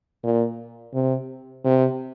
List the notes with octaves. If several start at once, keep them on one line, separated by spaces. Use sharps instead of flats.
A#2
C3
C3